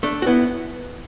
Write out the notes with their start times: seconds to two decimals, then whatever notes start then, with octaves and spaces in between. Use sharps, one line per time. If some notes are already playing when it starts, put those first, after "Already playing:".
0.03 A3 D4
0.22 F#4
0.26 B3 E4